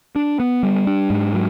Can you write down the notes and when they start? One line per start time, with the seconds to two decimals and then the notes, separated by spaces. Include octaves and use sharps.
0.16 D4
0.40 B3
0.63 G3
0.87 D4
1.10 G#2
1.34 F#3